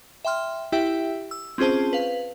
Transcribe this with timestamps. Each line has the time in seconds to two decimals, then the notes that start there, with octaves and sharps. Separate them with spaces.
0.25 E5 G5 C6 F6
0.72 E4 G4 E5 G5
1.31 E6
1.58 C4 C#4 F4 G#4 C5 A5
1.93 B4 F5